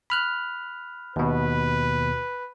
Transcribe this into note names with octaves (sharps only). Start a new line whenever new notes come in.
B5 F6 F#6
D#2 B2 B4